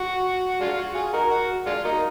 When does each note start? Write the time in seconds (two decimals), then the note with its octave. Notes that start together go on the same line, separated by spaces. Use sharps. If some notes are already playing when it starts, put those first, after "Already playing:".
Already playing: F#4
0.61 G#3 D4 F4
0.77 F#4
0.95 F4 G#4
1.13 D#4 F#4 A#4
1.30 F#4
1.66 G#3 D4 F4
1.84 F#3 A#3 D#4